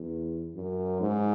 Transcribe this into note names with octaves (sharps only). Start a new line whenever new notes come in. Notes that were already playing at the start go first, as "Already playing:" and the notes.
Already playing: E2
F#2
G#2